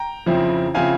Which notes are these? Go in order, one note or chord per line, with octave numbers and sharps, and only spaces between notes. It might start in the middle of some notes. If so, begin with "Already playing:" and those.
Already playing: G5 A#5
F2 C#3 F3 C4 E4
C#3 F3 C4 E4 F5 G#5